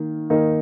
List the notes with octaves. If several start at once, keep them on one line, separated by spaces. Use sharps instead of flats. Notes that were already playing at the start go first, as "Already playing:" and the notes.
Already playing: D#3 A#3
D#3 A#3 D#4